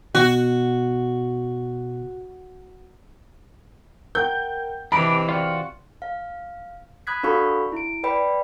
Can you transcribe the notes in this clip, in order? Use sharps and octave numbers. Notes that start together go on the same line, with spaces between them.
B2 F#4
A#4 F#5 G5 G6
C3 E3 D4 G4 D5 D#5 B5
F4 F#4 D5 G5 F6
F5
B5 D#6 F#6 G#6 B6
D4 F#4 A4 F5 B5 C#6
E4 D7
B4 D5 G5 B5